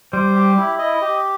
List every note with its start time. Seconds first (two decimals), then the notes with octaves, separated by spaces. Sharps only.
0.12 G3 C5
0.35 G4
0.57 E4
0.79 D#5
1.02 G4